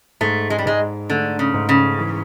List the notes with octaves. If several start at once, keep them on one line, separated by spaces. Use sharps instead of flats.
G#2 A3
G#3
G3
G#2 G#3
D3 A3
C#3
G#2
C#3
E3